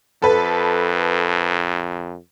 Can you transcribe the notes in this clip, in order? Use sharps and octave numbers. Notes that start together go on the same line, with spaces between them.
F2 A4 B4